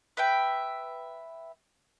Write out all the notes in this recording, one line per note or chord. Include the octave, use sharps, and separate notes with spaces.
B4 E5 G5